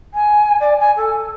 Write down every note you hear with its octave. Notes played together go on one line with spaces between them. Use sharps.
G#5
D5
G#5
A4